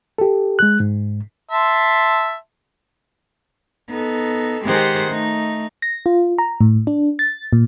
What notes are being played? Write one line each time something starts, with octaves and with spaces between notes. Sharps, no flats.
G4 A4
G#3 F#6
G#2
E5 A5 C6
B3 D#4 A4
D#3 G#3 G4 G#4 C5 F#5
A3 D#4
A#6
F4
A#5
A2
D4
A6
A#2